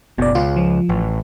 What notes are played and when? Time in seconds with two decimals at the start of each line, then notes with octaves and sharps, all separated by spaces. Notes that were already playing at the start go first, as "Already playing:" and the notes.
0.18 F#1 B2 D5
0.35 C#2 F4
0.56 F3
0.89 A1